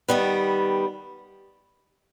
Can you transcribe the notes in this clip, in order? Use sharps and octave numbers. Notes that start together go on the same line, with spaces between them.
D#3 G3 B3